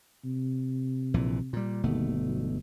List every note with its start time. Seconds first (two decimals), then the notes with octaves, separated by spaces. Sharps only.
0.24 C3
1.14 A#1 A#2 E3
1.53 A#2 G3
1.83 G1 D#2 B2 A3
2.21 B1